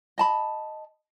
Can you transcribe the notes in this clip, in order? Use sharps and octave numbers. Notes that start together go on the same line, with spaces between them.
D#5 A5 B5